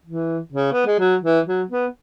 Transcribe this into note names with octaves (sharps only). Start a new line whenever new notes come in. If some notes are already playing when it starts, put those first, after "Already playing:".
E3
C#3
B3
G#3
F#3
E3
F#3
B3